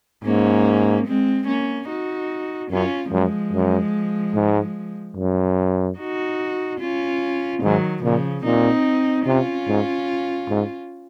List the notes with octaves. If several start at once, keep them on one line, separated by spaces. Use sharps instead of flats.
G#2 A#3 C#4
G#3 C4
A#3 C#4
D#4 F#4
F#2 C#4 F4
F#2 F3 G#3
F#2
G#2
F#2
D#4 F#4
C#4 F4
G#2 D#3 F#3
A#2 C#3 F3
A#2 C4 D#4
C3 C#4 F4
G#2
G#2